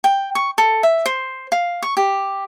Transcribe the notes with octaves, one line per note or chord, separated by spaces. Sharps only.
G5
C#6
A4
E5
C5
F5
C#6
G4